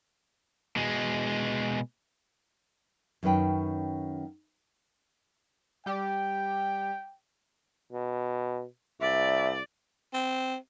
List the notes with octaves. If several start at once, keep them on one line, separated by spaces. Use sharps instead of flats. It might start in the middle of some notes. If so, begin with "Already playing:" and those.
B2 G#3
F#2 D#3 C#4 B4 G5
G3 G4 G5
B2
C2 D5 E5
C4